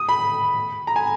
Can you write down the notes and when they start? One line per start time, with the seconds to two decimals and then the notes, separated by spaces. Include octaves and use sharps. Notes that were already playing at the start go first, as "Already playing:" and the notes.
Already playing: D#6
0.09 B5
0.87 A#5
0.96 G#5